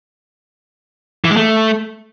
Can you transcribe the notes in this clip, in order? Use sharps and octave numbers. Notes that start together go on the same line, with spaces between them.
E3
G#3
A3